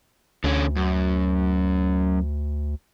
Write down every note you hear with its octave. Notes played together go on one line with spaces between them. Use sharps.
D2 D3 C#4
F#2